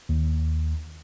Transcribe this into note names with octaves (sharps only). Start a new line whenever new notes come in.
D#2